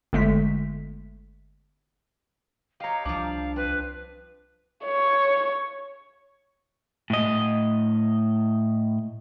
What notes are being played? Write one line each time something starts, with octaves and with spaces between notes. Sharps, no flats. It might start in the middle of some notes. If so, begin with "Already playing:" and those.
G1 D3 G#3 A3 B6
G4 C#5 D#5 F5 A#5
C2 F3 D4 D6
C4 B4
C#5
A2 D#5